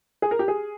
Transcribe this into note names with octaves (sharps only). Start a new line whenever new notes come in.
G#4
A#4
G4
G#4